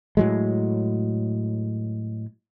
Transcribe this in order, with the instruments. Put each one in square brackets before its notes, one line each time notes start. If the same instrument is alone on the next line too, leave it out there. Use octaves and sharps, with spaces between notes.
[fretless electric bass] A2 F#3 G#3